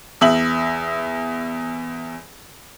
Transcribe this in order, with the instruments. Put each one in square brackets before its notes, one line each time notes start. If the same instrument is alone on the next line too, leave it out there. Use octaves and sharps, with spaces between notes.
[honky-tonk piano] E2 E5 F#7